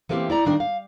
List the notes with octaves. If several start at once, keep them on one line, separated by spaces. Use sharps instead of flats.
E3 A3 A#3 C4 G4
E4 D5 A#5
G2 D#3 D4 A#4
F5